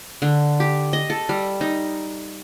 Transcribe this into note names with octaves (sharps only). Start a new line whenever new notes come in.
D3
G4
D#5
A4
G3
D#4